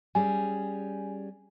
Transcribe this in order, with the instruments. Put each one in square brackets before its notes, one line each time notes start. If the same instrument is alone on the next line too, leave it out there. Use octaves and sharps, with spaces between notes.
[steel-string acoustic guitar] G3 C#4 G#4 [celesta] G#5